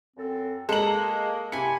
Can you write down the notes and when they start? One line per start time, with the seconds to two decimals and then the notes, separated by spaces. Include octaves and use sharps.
0.17 F#2 C4 A4
0.69 G#3 A#3 G#4 A4 A#5 F#7
1.52 C3 E4 G#5 C#7